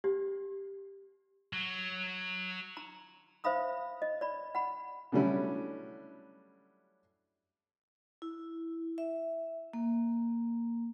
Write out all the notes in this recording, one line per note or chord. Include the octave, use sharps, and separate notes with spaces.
G4
F#3
A#5
C5 E5 F5 B5 D#6
D#5
D5 B5
F#5 B5
D3 F#3 G3 A3 C#4 E4
E4
E5
A#3